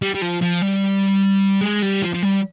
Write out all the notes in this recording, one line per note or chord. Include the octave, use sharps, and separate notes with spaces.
G3
G3
F3
F3
G3
G#3
G3
F3
F3
G3